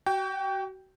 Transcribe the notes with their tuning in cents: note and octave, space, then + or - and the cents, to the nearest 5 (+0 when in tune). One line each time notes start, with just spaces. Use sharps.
F#4 +35 G5 +0